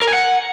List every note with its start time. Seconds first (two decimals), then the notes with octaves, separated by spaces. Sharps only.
0.02 A#4
0.07 G#5
0.13 F#5